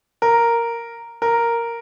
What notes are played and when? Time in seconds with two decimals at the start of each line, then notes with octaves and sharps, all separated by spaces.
0.22 A#4
1.22 A#4